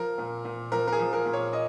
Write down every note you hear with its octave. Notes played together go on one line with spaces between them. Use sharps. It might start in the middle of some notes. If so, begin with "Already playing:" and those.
Already playing: F3 A#4
A#2
A#2
F3 A#4
A#4
G#4
F3
A#4
A#2
C#5
D#5